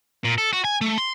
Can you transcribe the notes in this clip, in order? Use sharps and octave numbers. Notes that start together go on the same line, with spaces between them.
A#2
A4
F#4
G#5
A3
C6